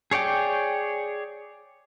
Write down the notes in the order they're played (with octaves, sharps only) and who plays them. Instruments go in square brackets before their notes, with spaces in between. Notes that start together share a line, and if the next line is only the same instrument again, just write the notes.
[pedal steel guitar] G#4 C#5 D5 G5 D6